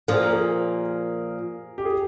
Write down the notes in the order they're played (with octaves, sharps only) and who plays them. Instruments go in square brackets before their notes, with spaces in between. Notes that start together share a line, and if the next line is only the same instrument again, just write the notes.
[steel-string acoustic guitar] A#2 F3 A#3 [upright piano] G#4
[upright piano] A#4
G#4
G4
G#4